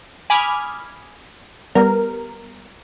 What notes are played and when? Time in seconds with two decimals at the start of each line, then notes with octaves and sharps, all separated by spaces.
0.30 G#5 B5 D6 D#6 F6 G#6
1.75 G3 B3 A#4